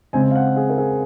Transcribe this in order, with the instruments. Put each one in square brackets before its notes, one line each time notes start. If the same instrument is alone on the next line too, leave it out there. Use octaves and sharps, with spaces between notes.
[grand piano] C#3 G#3 C4 G#5
F5
F#5
G#4
A#4
G#4